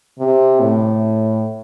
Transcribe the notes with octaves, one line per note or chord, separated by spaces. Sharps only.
C3
A2